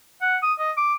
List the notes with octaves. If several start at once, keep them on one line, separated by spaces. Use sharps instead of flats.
F#5
D#6
D#5
D6